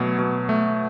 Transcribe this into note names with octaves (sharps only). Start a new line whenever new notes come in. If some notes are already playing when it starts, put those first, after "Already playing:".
Already playing: B2 F#3 A3
B2
A3